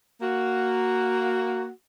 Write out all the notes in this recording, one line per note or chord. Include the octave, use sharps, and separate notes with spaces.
A#3 F#4